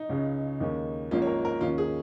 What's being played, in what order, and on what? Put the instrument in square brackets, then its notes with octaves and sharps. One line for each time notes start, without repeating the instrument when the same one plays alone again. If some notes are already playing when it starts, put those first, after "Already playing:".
Already playing: [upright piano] D#4
C#2 C#3 G#3 C#4
D#2 D#3 G#3 C#4
G#1 G#2 F3 A#3 C#4 F4
C#5
A#4
A#4
D#2 D#3 C#4 F4
G#4